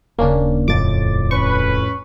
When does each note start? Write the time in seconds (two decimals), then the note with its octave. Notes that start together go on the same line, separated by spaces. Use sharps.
0.19 D#1 C#3 A#3 C#4 D4
0.68 F2 A2 D6 A6
1.31 C#4 B4 C#6